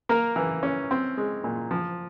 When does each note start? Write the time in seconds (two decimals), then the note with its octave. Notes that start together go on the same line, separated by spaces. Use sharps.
0.09 A#3 A#4
0.36 E3
0.63 C#4
0.91 C4
1.17 G#3
1.44 A#2
1.71 F3